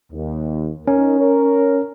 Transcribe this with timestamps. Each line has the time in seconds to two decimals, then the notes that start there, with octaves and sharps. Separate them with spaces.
0.12 D#2
0.88 C#4 D#4 A#4
1.20 A#4 C#5